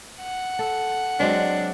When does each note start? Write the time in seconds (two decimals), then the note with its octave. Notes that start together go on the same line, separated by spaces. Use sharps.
0.20 F#5
0.59 A4
1.20 F#3 G#3 C4 D4